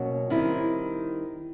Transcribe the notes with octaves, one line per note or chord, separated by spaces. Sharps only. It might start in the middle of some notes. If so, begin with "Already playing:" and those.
Already playing: B2 F#3 A#3 C#4 F#4
D#3 G3 C4 E4